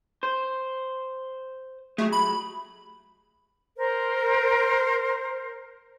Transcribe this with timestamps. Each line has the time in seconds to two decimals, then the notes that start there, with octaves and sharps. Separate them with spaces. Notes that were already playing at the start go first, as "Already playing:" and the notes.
0.23 C5
1.98 F#3 G#3 A3
2.12 B5
3.77 A#4 C5